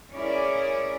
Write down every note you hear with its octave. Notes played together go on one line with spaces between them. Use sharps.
C#4 E4 G#4 A#4 D5